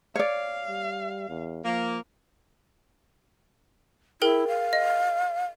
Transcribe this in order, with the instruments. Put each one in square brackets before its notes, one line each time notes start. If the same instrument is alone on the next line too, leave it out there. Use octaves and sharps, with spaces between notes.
[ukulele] C#5 D5 [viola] F5
[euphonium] G3
E2
[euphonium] F3 [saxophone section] A#3
[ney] E4 [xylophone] G#4 A#4 G5
[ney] F5
[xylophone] D#5